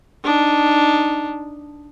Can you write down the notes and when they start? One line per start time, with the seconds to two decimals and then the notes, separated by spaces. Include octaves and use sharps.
0.24 D4 D#4